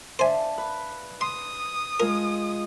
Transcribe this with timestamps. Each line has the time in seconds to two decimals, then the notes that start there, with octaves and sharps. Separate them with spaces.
0.19 D4 C5 D5 E5 F5 G#5
0.58 B4
1.21 C6 D#6
2.00 G#3 F4 A#4